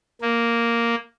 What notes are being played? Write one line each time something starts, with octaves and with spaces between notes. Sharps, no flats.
A#3